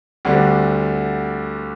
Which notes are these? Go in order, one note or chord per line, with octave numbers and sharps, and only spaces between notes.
D2 D3 G3 C4